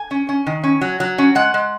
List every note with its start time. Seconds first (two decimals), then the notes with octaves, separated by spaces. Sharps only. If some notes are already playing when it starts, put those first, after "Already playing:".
Already playing: G#5
0.11 C#4
0.29 C#4
0.47 D#3
0.64 C#4
0.81 F#3
1.00 F#3
1.18 C#4
1.35 G#3 F#5
1.54 G#3